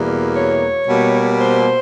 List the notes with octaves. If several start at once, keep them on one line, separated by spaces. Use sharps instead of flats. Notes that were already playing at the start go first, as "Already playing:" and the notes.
Already playing: E2 B2 G3 A#3
C#5
B2 G3 A#3
C5